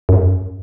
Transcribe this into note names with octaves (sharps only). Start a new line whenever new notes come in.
F#2